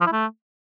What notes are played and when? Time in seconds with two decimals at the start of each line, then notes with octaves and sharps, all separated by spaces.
0.01 F3
0.07 E4
0.12 A3